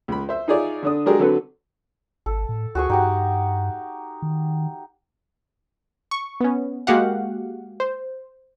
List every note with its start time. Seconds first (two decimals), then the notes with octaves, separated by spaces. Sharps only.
0.08 C#2 B5
0.29 C5 E5
0.48 D#4 F4 G#4 C#5 D5 E5
0.83 D3 D4 D#6
1.06 F#3 G#3 D4 G4 G#4 A#4
1.19 D3 F#3 C4 A4 B4
2.26 G#1 A4
2.49 A2
2.75 D2 F#4 G#4 C#6
2.90 G2 D#4 G4 F#5
4.22 D#3
6.11 C#6
6.40 B3 C#4
6.87 G#3 A#3 F#4 G4 F5 F#5
7.80 C5